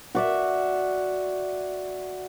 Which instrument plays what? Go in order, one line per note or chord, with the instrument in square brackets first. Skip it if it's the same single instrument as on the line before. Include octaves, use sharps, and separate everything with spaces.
[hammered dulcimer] F#4 D5 E5